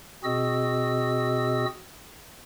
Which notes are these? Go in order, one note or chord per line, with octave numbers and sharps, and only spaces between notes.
B2 C4 F#4 G#4 D#5 E6